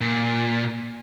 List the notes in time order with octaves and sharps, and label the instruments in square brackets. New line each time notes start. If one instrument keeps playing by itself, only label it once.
[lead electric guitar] A#2